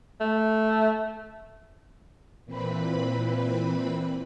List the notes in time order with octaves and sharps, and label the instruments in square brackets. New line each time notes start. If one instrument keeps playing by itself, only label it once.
[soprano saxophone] A3
[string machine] A#2 E3 C4 B4 B5